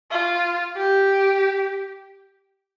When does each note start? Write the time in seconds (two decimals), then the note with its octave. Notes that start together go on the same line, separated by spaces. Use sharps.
0.11 F4
0.77 G4